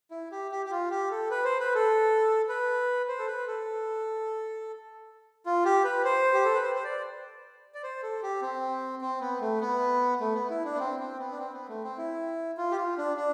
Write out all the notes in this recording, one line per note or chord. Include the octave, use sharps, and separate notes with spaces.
E4
G4
G4
G4
F4
G4
A4
B4
C5
B4
A4
B4
C5
A4
B4
A4
F4
G4
B4
C5
G4
A4
B4
C5
C5
D5
D5
C5
A4
G4
C4
C4
B3
A3
B3
A3
B3
E4
D4
B3
C4
C4
B3
D4
C4
B3
A3
C4
E4
F4
G4
F4
D4
D4